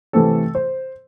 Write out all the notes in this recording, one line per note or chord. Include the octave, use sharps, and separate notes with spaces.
C3 E3 A3 C4 A4
C5